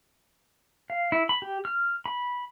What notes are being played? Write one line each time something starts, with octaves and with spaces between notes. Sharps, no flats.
F5
E4
B5
G4
F6
B5